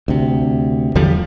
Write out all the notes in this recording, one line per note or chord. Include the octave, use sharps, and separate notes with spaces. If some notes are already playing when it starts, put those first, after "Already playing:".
D2 C3
E2 D3 F3 G3